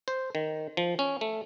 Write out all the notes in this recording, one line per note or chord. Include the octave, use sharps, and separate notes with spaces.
C5
D#3
F3
C#4
A3